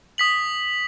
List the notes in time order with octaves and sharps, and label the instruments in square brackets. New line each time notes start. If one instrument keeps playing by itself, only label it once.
[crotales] D#6 B6 F#7